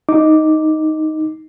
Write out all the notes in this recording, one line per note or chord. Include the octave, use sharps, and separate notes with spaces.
D#4 D6